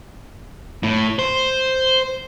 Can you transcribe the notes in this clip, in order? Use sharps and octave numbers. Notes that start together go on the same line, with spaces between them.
A2
C5